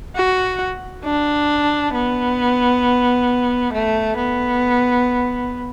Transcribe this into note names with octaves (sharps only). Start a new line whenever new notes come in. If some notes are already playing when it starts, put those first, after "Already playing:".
F#4
D4
B3
A3
B3